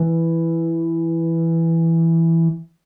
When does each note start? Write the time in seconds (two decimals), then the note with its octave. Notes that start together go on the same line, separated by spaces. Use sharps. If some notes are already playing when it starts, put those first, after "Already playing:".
Already playing: E3